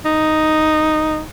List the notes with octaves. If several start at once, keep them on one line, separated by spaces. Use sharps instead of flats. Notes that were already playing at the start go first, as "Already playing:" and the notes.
D#4